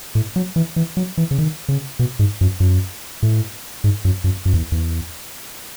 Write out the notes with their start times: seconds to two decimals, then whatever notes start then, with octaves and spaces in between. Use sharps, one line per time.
0.15 A2
0.36 F#3
0.56 E3
0.76 E3
0.97 F#3
1.18 E3
1.31 C#3
1.38 D#3
1.69 C#3
1.99 B2
2.19 G#2
2.41 F#2
2.60 F#2
3.23 A2
3.84 G#2
4.05 F#2
4.24 F#2
4.45 F#2
4.53 E2
4.72 E2